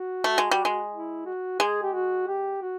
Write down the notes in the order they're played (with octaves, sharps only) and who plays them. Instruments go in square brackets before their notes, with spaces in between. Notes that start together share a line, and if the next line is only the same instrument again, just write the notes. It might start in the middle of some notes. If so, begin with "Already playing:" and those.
Already playing: [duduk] F#4
[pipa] A3
G#3
G3
G#3
[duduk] E4
F#4
[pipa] G#3 [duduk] G#4
[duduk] G4
F#4
G4
F#4